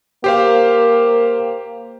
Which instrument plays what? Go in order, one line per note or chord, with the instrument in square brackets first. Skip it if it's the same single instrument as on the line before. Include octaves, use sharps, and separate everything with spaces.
[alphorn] A#3 [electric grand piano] G4 C5 F5